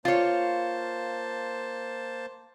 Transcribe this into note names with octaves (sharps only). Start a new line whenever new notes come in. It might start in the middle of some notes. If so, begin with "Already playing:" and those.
A#3 F4 C5 C#5 A5